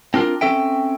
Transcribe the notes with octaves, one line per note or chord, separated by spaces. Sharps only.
C4 D4 F4 A#4
C4 C#4 A4 E5 G5